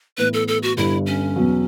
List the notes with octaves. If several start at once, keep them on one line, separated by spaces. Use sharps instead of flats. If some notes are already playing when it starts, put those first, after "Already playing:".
A2 E3 B3 B4
A4
A4
F#4
G1 G2 D3 G3 E4
C#4
E2 B2 F#3